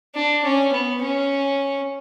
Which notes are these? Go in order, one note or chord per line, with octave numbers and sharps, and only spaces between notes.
D4
C#4
B3
C#4